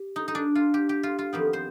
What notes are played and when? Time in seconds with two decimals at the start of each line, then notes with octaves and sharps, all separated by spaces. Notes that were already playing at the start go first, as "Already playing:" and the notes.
Already playing: G4
0.16 D#4
0.28 D#4
0.35 D4
0.55 F4
0.74 G4
0.89 G4
1.03 F4
1.19 F4
1.33 F2 D#3 B3 G4
1.53 C5